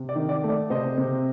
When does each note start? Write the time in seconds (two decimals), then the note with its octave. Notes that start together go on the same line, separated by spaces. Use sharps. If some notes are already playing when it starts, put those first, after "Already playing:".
Already playing: C3
0.09 D5
0.15 D#3
0.29 D5
0.43 A3
0.49 D5
0.70 C3 C5 D#5
0.98 C3